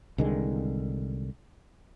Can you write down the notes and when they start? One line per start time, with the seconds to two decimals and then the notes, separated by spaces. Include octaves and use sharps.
0.18 C2 D3 D#3 G#3